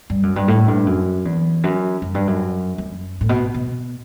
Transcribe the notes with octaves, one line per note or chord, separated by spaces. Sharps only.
G2
F#2
G2
A2
G2
F#2
E2
F#2
F#2
G2
F#2
F#2
A2
B2
B2